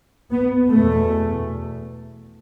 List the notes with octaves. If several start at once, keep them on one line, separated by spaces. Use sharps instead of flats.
B3
E2 B2 A3